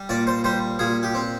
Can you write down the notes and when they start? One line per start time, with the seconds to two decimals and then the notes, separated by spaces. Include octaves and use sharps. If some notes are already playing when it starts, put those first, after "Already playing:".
Already playing: G3
0.09 A#2 D5
0.27 C5
0.44 G3 C5
0.79 A#2 G#4
1.03 G4
1.15 C4